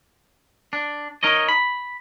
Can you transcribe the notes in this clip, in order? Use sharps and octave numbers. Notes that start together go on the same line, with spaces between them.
D4
D#4 A#4 C#5 D#5
B5